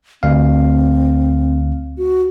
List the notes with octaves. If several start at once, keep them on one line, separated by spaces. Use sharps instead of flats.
D2 C4 F5
F#4